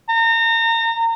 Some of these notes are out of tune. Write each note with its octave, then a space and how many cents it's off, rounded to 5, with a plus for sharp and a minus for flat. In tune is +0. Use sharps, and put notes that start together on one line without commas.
A#5 -30